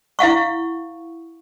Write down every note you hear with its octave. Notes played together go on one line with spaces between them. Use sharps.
E4 F5 F#5 C#6